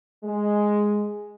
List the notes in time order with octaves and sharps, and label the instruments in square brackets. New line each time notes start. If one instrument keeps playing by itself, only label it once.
[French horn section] G#3